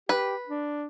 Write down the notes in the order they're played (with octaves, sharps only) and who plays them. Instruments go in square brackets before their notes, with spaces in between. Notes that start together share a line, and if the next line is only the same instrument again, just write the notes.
[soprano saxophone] G4 [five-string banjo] B4
[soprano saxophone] D4